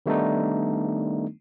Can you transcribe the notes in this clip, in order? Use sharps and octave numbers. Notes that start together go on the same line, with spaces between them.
D#3 G3 A3 B3 D4 D#4